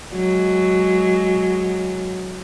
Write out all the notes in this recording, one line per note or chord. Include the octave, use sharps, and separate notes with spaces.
F#3 G#3